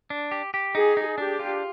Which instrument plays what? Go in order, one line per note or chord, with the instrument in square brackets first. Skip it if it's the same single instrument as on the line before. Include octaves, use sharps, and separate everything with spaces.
[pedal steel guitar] D4
G4
G4
[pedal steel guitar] D#4 [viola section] G#4
[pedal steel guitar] D#4
[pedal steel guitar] D4 [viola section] G4
[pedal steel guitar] F4